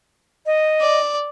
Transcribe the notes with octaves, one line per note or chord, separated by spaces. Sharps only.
D#5
D5